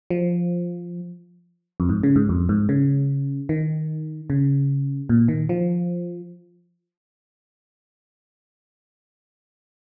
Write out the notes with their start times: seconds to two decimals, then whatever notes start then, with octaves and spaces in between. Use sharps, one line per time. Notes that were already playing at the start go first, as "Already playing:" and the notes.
0.10 F3
1.80 F2
1.89 G#2
2.03 C#3
2.16 G#2
2.29 F2
2.49 G#2
2.69 C#3
3.49 D#3
4.30 C#3
5.09 A#2
5.28 D#3
5.49 F3